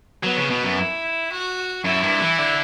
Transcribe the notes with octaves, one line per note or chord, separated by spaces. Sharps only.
F#3 B3
C#3
B2
F#2
E4
F#4
F#2 E4
G2
E3
D3